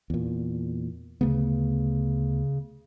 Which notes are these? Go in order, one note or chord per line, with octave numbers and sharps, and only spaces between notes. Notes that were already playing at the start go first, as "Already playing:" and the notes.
E2 A#2
D2 C#3 A3 B3